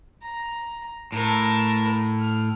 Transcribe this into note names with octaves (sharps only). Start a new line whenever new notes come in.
A#5
A2 A#4 A5
F6